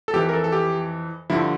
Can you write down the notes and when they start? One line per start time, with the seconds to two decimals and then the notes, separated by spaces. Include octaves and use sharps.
0.08 A4
0.13 F2 E3 G4
0.29 A#4
0.33 A4
0.44 A4
0.52 G4
1.30 G2 D3 F3 E4